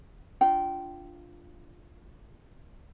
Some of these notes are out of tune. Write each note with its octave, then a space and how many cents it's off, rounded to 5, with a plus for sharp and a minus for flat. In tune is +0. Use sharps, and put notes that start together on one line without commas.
D4 +0 F4 +0 G5 -20